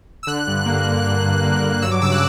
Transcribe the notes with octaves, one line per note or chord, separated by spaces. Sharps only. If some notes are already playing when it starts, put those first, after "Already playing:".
E6
D3 F#6
G2
A#3
G2
D3 F#6
G2
A#3
G2
F#3 E6
D6
C#3 E6
F#6